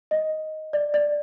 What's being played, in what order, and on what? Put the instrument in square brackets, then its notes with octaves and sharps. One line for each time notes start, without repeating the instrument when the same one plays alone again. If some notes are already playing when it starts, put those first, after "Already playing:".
[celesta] D#5
D5
D5